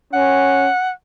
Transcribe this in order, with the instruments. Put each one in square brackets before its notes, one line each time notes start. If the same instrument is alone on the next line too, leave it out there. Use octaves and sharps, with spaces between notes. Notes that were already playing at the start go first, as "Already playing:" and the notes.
[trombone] C#4 [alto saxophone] F#5